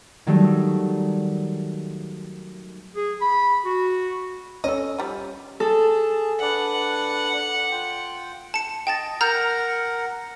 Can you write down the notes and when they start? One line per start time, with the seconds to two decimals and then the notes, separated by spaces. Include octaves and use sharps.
0.27 D#3 F#3 G3 A3 D#4
2.96 G#4
3.21 B5
3.66 F#4
4.64 C#4 A4 D#5
4.98 F3 G3
5.60 G#4 A4 A5
6.42 D4 B4 D5 F#5
7.72 F4 G5
8.54 A5 C#7
8.87 D#5 G5 A5 A6
9.21 A#4 F#5 A#5 F6 G6